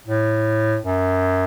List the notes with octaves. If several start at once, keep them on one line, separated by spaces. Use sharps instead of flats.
A2
F#2